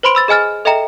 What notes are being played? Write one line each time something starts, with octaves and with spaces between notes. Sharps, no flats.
B4 C5 B5 C6 D7
B5 E6 A6
G#4 D#5 G#5 F6 A6
A4 D#5 E5 G5 A#5